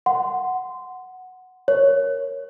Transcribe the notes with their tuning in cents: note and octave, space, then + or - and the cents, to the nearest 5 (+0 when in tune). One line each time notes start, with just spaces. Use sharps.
F#5 +0 C6 -15
A#4 +5 C#5 +0